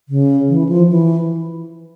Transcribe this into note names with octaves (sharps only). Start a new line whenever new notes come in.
C#3
E3
F3
E3